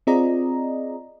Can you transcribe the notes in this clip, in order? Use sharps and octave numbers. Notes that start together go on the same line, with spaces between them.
C4 F4 G#4 D5 D#5 A#5